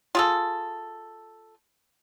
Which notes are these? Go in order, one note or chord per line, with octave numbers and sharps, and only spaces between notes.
F4 G#4 A4